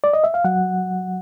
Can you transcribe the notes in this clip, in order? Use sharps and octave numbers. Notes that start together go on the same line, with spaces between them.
D5
D#5
E5
F5
F#3 F#5